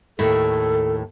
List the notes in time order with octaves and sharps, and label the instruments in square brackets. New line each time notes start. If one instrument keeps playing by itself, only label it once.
[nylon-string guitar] D#2 A2 [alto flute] A4